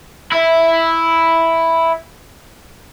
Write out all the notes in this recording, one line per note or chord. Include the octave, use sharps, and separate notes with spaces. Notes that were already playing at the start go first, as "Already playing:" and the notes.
E4 E5